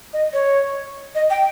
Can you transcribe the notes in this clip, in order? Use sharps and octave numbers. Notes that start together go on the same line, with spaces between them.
D#5
C#5
D#5
G5